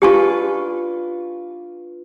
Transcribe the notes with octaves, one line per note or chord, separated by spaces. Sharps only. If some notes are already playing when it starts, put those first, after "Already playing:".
D4 F4 G4 B4 G#5 C#6